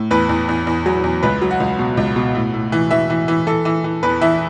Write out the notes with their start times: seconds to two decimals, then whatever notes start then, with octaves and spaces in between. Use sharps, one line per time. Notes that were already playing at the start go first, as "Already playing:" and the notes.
Already playing: A2
0.11 E2 B4
0.29 E2
0.49 E2
0.67 E2
0.86 F#3
1.04 E2
1.23 C#2 B4
1.41 F#3
1.50 F#4
1.60 C#2
1.79 B2
1.97 C#2
2.16 B2
2.35 A2
2.54 A2
2.72 E3
2.90 E3 E5
3.10 E3
3.28 E3
3.47 E3 A4
3.65 E3
3.84 E3
4.03 E2 B4
4.21 E3 E5